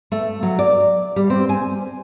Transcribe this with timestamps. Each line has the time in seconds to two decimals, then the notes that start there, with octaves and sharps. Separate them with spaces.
0.12 A3
0.43 F#3
0.59 D5
1.16 G3
1.30 C4
1.49 G#5